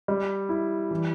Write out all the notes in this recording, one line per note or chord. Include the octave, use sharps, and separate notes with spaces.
G3
E4
E3